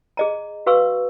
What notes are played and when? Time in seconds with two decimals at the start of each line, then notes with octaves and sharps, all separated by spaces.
0.17 G#4 D#5 A#5
0.66 F#4 B4 F5 C#6 E6